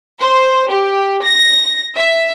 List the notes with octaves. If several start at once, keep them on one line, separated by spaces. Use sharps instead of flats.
C5
G4
A#6
E5